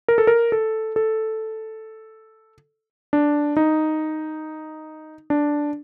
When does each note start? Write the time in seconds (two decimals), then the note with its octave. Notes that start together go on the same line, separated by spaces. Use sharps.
0.08 A#4
0.18 A4
0.27 A#4
0.52 A4
0.96 A4
3.13 D4
3.57 D#4
5.30 D4